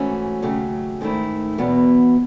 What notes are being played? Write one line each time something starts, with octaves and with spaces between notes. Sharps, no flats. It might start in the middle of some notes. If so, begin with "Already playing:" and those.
Already playing: G#2 E3 A3 C#4 F#4
D#2 C#3 F#3 A3
G#2 D#3 A3 E4
E2 B2 F#3 B3